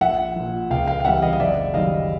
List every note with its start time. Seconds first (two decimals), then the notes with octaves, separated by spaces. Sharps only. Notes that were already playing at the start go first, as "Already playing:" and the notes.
0.01 A#1 E5 F#5
0.36 A#2 F3
0.70 C#2 F5 G5
0.87 F5 G5
1.00 F5
1.05 C3 E3 G3 E5 F#5
1.22 D#5 F5
1.33 D#5
1.40 F#1 D5 E5
1.74 F#2 D#3 G3 D#5 F5